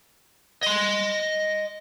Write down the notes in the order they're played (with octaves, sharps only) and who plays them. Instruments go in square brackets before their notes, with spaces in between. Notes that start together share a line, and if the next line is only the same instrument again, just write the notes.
[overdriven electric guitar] D#5 C6